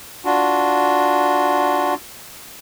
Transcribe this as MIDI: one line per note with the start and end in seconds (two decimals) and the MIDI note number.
0.25 1.94 62
0.25 1.94 65
0.25 1.94 66